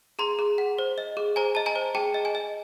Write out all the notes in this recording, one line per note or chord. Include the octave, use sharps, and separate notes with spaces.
G#4 A#5 C6
G#4
F#5
C5
D#5
G#4
C5 G#5 A#5
D#5 A5
G#5 A#5
C5
G#4 G5 A5
D#5
G#5
D#5